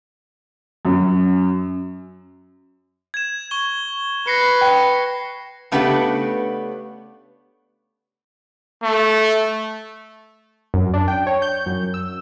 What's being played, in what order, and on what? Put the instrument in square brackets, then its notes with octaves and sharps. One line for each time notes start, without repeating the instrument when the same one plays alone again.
[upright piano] F#2
[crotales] G#6 E7
C#6 G7
[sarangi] B4 [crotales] A#6 C7 C#7
[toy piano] G5
[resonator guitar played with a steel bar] C#3 A3 B3 D4 G4 B4
[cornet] A3
[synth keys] F#2
D4
G5
C#5
G6
F#2
E6